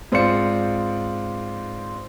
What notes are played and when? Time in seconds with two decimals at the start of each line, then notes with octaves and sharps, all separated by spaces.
0.12 G#2 C4 F4 D5 C#7